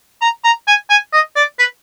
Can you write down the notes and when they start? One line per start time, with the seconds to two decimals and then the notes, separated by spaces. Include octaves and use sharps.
0.22 A#5
0.44 A#5
0.67 G#5
0.90 G#5
1.13 D#5
1.36 D5
1.59 B4